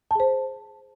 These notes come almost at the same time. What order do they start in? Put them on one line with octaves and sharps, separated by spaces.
A5 G#4 C5